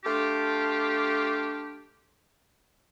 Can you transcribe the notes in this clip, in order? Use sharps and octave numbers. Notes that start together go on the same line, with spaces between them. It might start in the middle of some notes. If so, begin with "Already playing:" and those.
A3 D4 F4 G4